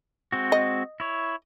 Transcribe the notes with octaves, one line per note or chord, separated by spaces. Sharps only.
G#3 C4 F#4
D#5
E4 C#5